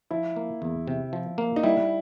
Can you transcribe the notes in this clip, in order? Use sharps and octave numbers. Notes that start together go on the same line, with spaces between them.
F3 E4
A#3
E2
C3
F3
A#3
D#4
G3 E4